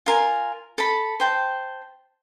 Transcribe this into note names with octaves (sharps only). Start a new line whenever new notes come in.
F4 A#4 G#5
A4 A5 B5
C5 G5 A5